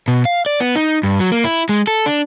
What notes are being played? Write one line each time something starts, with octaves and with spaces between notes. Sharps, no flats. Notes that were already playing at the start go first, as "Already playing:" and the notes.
B2
F5
D5
B3
D#4
G2
F#3
A#3
E4
G#3
A4
D4